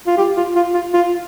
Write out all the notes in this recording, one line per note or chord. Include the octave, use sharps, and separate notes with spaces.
F4
G4
F4
F4
F4
F4